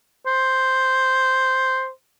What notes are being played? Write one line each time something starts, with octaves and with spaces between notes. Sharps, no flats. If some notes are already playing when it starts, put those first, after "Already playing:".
C5